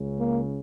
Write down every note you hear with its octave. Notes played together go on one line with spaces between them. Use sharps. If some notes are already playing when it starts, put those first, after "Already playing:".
Already playing: C#2 C#3
A#3